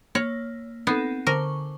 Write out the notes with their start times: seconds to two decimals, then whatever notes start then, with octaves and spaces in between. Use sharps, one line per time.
0.15 A#3 C#5
0.87 B3 C4 D#4 A4
1.27 D3 A#4 C5 C#6